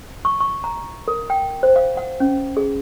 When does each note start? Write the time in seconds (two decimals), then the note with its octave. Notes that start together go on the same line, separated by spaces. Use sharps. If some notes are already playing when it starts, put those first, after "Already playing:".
0.25 C#6
0.41 C#6
0.64 A#5
1.08 A#4
1.30 G5
1.63 C5
1.76 F5
1.97 F#5
2.20 C#4
2.57 G#4